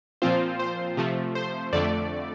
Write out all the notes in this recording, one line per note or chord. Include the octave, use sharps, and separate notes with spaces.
A#2 F3 C4 F4 C5
C5
C3 F3 A3
C5
F2 D3 A3 D5